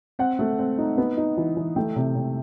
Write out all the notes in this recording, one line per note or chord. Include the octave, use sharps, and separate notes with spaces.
C4 F#5
A3
C4
D#4
B3
D#4
E3
E3
A3 G5
C3
C3